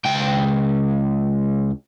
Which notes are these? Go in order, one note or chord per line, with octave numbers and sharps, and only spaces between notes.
C#2 G5